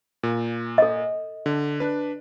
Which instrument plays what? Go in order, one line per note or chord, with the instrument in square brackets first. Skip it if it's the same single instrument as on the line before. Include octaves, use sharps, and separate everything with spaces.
[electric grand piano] A#2
[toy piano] A4 D#5
[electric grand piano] D3
D4 B4